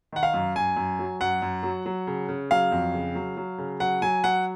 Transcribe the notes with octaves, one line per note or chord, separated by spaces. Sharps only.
D#3 F#5
F5
F#2
F#2 G#5
F#2
F#3
F#2 F#5
F#2
F#3
F#3
C#3
C#3
F#3 F5
F2
C#3
F#3
F#3
C#3
F#3 F#5
F#3 G#5
F#3 F#5